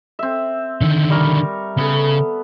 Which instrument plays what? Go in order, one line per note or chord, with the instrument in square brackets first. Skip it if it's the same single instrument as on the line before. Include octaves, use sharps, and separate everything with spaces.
[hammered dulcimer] C4 E5
[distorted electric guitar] D3 D#3
[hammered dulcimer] G3 A#4 C#6
[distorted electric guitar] C#3 [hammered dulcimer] B3 A4